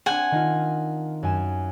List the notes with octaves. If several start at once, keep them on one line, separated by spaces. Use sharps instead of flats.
C4 D4 F#5 G#5
D#3 D#4 F4
F#2 G#5 E7